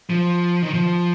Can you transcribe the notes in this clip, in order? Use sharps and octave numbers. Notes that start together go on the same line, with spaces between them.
F3
D#3
F3